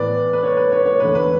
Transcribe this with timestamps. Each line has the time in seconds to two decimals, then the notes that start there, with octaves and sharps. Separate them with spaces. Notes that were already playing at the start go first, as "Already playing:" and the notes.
Already playing: A2 E3 B3 B4 D5
0.33 B4
0.43 C#5
0.57 B4
0.72 C#5
0.86 C#5
1.00 E2 D3 A3 B4
1.15 B4